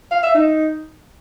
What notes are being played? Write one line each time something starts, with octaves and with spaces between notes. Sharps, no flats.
F5
E5
D#4